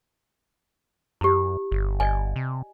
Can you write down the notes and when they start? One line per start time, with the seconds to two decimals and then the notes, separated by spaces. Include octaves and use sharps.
1.21 F#2 E4 G4
1.72 G1
2.00 G1 D5 D#5 G#5
2.36 C3